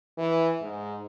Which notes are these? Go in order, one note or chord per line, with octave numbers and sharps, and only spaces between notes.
E3
G#2